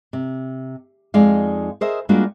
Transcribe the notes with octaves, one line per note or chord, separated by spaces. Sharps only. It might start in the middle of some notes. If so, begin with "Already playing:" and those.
C3
F2 G#3 D#4 D5 F5
G#4 A#4 C5 D#5 E5
G3 G#3 A#3 D4 F4 F#4